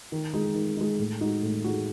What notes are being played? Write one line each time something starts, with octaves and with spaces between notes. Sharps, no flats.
D#3
G#3 D#4
D#3
G#3 D#4
A2
G#3 D#4 F#4
A2
G#3 D#4 F#4